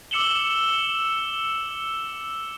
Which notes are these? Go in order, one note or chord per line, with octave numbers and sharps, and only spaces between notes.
D6 E6 C#7 E7 F#7 G7